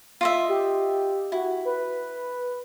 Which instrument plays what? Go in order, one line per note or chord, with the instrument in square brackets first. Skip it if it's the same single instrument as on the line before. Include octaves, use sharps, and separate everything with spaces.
[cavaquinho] F4 D#5 E5
[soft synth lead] G4
[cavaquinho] E4 [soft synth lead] F#4
[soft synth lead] B4